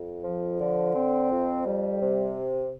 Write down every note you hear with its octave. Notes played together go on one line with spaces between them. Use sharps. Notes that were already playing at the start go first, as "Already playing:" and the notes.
Already playing: F2
F3
D3
C4
F2
G3
C3